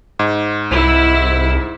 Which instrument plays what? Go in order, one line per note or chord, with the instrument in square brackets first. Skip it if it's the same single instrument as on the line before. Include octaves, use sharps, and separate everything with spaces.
[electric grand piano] G#2
[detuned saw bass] C2 [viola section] E4